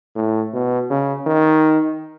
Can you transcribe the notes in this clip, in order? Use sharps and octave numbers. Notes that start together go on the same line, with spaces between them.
A2
B2
C#3
D#3